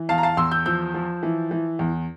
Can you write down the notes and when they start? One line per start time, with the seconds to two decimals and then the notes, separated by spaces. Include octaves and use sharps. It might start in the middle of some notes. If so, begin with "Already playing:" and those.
Already playing: E3
0.09 E2 F5 A5
0.18 A#5
0.23 F5 A5
0.37 E2 C6 E6
0.51 E6 G6
0.66 F3 E6 G6
0.94 F3
1.23 E3
1.51 E3
1.79 E2